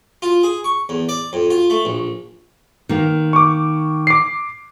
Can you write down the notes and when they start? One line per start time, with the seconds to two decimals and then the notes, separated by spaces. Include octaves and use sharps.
0.22 F4
0.43 G#4
0.64 C#6
0.89 E2
1.09 D5
1.33 F2
1.50 F4
1.70 A3
1.85 A#1
2.89 D#3 A#3
3.33 C#6 D6
4.07 D6 C7